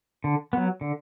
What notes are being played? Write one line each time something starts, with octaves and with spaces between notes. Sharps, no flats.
D3
F#3 B3
D3